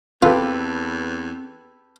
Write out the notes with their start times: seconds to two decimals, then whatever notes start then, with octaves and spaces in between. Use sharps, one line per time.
0.23 E2 C4 F4 G4 A4 B4